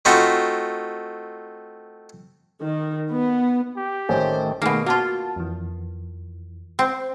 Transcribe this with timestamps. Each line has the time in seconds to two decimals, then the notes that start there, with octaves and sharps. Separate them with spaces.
0.05 A3 C4 D#4 F4 F#4
2.64 D#3
3.10 B3
3.77 G4
4.09 A1 D#3 A3 C5 G5 G#5
4.62 B2 D#3 A3 A#3 G#4
4.86 A#3 F4 F#4 A5
5.36 F2 E3
6.79 C4